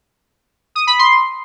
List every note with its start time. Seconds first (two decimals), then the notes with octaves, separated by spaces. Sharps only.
0.75 D#6
0.87 B5
0.99 C6